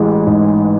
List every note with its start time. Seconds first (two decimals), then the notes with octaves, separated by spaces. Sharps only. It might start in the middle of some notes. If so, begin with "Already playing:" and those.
Already playing: A1 E3 G#3
0.27 G#2